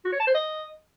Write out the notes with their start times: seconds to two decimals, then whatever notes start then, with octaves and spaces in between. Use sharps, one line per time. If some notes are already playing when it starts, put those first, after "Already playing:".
0.05 F#4
0.12 C#5
0.20 A5
0.27 C5
0.34 D#5